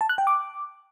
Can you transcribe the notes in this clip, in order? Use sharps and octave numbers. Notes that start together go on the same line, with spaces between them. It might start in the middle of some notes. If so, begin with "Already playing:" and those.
A5
F#6
G5
D6